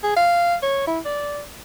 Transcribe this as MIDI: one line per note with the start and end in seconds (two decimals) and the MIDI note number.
0.03 0.13 68
0.16 0.55 77
0.63 0.84 73
0.87 0.99 64
1.05 1.42 74